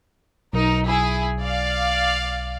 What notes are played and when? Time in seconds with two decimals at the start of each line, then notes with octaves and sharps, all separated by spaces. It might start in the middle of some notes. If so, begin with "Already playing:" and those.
0.53 B1 D#4 A#4
0.86 E4 G#4
1.42 D5 F5